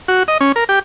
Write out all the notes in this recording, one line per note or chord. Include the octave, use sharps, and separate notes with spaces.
F#4
D#5
C#4
A#4
G4